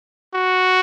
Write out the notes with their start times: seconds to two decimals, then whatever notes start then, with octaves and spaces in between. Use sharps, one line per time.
0.34 F#4